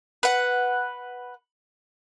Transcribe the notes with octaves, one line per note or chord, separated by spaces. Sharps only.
B4 F#5